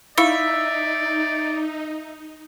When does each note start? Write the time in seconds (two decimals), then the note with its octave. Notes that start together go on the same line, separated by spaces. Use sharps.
0.18 D#4 E4 D5 E5 F5 B5